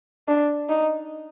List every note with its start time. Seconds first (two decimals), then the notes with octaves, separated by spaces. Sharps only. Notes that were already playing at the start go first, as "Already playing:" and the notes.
0.28 D4
0.69 D#4